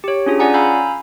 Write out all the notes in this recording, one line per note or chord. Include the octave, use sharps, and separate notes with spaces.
G4 C#5
C#4 D4 F4 G#4
C#4 F4 D5 F#5 G#5 A#5
F5 G#5 A#5 B5 E6 G6